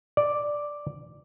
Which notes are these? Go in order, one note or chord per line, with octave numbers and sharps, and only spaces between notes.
D5